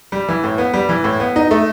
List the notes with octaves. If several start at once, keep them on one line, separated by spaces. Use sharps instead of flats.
G3
E3
A2
B3
G3
E3
A2
B3
D#4
A3